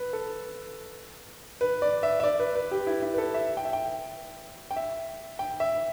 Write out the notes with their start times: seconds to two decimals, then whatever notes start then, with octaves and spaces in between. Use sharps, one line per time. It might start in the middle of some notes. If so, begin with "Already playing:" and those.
Already playing: B4
0.13 A4
1.61 B4
1.82 D5
2.03 E5
2.20 E5
2.23 D5
2.40 B4
2.55 B4
2.71 G4
2.87 E4
3.02 E4
3.14 B4
3.18 A4
3.34 E5
3.57 G5
3.65 E5
3.73 G5
4.71 G5
4.76 E5
5.39 G5
5.60 E5